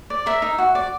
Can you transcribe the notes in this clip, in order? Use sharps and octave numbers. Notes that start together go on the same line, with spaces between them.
D5
A#4 E5
D#4
F#4
D5